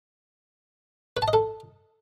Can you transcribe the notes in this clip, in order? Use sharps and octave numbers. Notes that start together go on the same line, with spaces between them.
B4
A5
D#5
A4